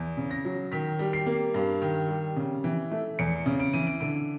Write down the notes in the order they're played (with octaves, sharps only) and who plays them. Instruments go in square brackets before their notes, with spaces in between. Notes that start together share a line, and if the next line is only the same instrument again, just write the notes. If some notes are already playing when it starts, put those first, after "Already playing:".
Already playing: [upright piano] E2
C#3
A#6
F#3
D#3 B6
G3
C7
A#3
G2
D#3
G3
C#3
E3
A3
E2 C#7
C#3
D7
E3 D#7
D7
D3 D7